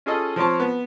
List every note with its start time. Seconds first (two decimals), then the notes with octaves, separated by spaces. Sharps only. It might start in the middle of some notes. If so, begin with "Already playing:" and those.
0.06 C#4 F4 G#4 A4 D#5
0.36 F3 C4 F4 C#5 A5
0.60 B3